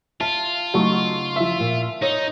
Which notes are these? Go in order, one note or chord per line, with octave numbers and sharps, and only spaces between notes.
F4 E5 A5
C#3 F#3 A3 D#4 C#6
F3 E5
A#2
D#4 C#5